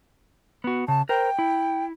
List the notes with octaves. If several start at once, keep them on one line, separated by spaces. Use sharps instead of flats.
B3 F#4
C#3 A5
A#4 C5 G5
E4